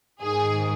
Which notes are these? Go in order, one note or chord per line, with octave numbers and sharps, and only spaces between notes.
G#2 D#3 G#4